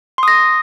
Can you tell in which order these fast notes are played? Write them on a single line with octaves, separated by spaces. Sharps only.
C6 D#6 A#6